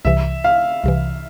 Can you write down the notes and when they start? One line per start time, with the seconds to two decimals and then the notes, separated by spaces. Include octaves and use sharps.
0.05 C2 C3 E3 E5
0.44 F5
0.84 C2 C3 E3